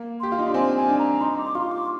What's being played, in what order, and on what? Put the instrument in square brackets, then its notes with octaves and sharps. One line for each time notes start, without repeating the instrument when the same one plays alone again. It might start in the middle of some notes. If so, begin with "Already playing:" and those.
Already playing: [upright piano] A#3
[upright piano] G4 [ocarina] C6
[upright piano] F4
D#4
D4
[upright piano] C4 [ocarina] G#5
[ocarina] G#5
[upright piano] D4
[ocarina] A#5
[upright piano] D#4 [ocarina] C6
[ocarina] D6
[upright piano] F4 [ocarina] C6
[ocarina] D6